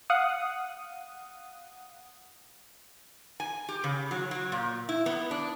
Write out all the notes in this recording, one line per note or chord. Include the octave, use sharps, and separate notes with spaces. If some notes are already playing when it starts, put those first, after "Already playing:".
F5 F#5 D#6
G#5
G4
C#3
F#3
F#3
A#2
E4
B3
D4